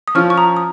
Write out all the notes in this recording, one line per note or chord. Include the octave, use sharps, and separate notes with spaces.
D#6
F3 C#4 F4 C#6 F6
C#6
A#5 D#6
D#6